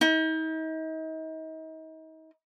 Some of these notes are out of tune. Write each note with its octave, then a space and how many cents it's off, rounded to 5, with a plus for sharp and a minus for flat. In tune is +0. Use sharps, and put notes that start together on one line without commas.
D#4 +40